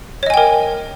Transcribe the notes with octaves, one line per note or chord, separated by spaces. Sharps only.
A#4 C#5 D#5 G5 G#5